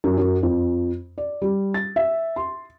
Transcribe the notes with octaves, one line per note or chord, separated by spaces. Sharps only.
F#2
F#2
F2
D5
G3
A6
E5
C6